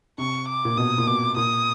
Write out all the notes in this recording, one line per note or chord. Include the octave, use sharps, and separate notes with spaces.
C3 C#6
D6
A#2
B2 D#6
A#2
B2 D6
A#2 D#6